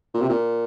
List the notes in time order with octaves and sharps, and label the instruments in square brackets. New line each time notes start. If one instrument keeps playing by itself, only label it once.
[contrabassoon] A#2
C3
A#2